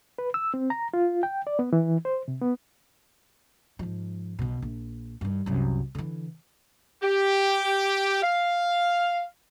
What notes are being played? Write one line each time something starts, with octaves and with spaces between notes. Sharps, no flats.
B4
E6
C4
A#5
F4
G5
D5
B3
E3
C5
C3
B3
G#2 F3
B1 B2
A#1
G2 D#3
C2 F#2
D3 E3
G4
F5